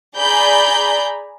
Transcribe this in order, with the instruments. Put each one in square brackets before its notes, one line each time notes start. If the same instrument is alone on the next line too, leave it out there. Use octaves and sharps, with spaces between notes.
[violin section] G#4 D5 G#5 A#5 B5 G6